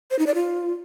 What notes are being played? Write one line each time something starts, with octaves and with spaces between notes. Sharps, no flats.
C5
D#4
D5
F4